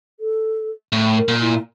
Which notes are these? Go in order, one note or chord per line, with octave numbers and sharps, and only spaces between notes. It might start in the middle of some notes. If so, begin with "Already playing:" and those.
A4
A2
A#4
A#2
E4